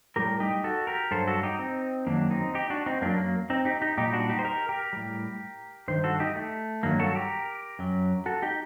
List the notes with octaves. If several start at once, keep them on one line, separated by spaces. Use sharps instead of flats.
A2 G3 G4 A#4
D#4 G4
F#4 A4
G4 A#4
G2 F#3 A4 C5
F#4 A4
D#4 G4
C4 D#4
F#2 D#3 F#3 A#3 D4
C4 D#4
D#4 G4
D4 F#4
C4 D#4
F#2 F#3 A#3 D4
A#3
C4 D#4
D#4 G4
D#4 G4
A#2 G3 D#4 G4
D4 F#4
D#4 G4
C5
G4 A#4
G4 A#4
A2 G3
G2 D#3 C5
F#4 A4
D#4 G4
A3
G2 D#3 F#3 A#3
F#4 A4
G4 A#4
F#2 F#3
F#4 A4
D#4 G4